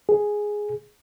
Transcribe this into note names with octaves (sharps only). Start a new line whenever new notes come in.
G#4